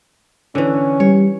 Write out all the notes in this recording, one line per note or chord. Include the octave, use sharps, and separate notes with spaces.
D3 E3 C#4
G3 C#5